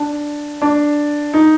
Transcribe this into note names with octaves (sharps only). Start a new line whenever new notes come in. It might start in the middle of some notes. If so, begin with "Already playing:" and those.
Already playing: D4
D4
D#4